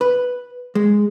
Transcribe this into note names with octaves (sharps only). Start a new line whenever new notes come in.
B4
G#3